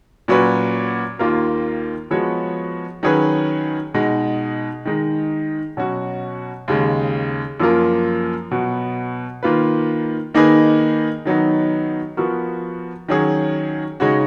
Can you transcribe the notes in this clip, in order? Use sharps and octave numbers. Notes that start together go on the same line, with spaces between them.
A#2 F#3 C#4 F#4 B4
D#2 D#3 A#3 F4 A#4
F3 G#3 B3 F#4 C#5
D#3 F#3 C#4 G#4 B4
B2 G#3 D#4
D#3 G#3 D#4
B2 F#3 C#4 F#4
D#2 C#3 G#3
F#2 F3 A#3 F4 A#4
B2 F#3 B3 F#4
D#3 A#3 F4 B4
D#3 A#3 D#4 G#4 B4
D#3 F#3 B3 D#4
F3 B3 F#4 A#4
D#3 F#3 C#4 G#4
C#3 G#3 D#4 F#4 C#5